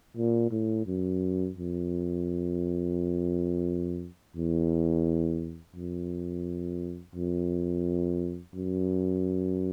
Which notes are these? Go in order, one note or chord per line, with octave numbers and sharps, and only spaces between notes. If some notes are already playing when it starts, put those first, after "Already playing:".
A#2
A2
F#2
F2
E2
F2
F2
F#2